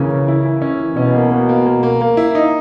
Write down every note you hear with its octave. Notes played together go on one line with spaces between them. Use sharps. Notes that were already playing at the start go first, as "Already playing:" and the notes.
Already playing: C#3 E3 A#3 C#4
E3
E4
E4
C#4
E3
B2 C#4
A#3
A#3
A#3
A#3
A#3
A#3
E4
D#4